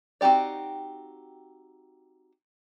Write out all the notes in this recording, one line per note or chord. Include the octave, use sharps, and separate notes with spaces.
C4 D#4 F#4 G4 D5